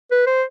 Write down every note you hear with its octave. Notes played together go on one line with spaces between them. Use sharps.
B4
C5